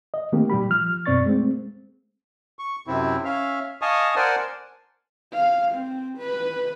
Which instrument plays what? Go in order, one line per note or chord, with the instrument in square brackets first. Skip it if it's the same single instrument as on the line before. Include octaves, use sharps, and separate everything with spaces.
[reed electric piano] D#5
D#3 A3 A#3 C4 G4
A#2 G3 G4 B5
F3 F6
F#2 B2 C4 D5 C#6 A6
G#3 A3 C4
[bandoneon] C#6
F#2 C3 C4 E4
C#4 E5 F5
D#5 F5 G#5 A5 C#6 D#6
A#4 C5 D5 F#5 G#5 A5
[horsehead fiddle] F5
C4
B4